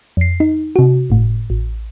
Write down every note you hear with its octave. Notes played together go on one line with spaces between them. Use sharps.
F2 C7
D#4
C3 F#4
G1 A2
A1